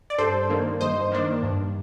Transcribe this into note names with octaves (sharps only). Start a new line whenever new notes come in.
D5
G2 A4 C5
D#3 A#3 D4
G2 C5 D#5
D#3 A#3 D4
G2